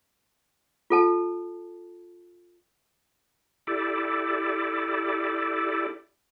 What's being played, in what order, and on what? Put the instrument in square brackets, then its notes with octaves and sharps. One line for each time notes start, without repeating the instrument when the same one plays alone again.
[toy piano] F4 A4 A5
[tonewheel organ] E4 G4 A4 D5